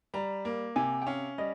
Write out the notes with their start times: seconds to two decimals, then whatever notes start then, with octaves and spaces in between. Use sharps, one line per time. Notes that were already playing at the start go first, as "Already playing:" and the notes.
0.14 G3 A#5
0.45 A#3
0.76 C3 G#5
1.02 G5
1.07 C#4 F5
1.38 G3 D#5